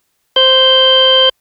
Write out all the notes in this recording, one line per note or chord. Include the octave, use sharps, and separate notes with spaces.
C5 G6